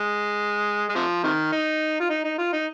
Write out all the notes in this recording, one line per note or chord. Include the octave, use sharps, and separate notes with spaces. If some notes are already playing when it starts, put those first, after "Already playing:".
Already playing: G#3
G#3
C3 F3
C3 D#3
D#4
F4
D#4
D#4
F4
D#4